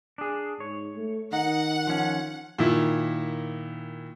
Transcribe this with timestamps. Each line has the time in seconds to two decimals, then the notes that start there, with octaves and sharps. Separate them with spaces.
0.18 D4 G#4
0.60 G#2 C#5
0.96 A3
1.33 D#3 D#4 F#5
1.87 F3 C#4
2.58 A#2 D#3 E4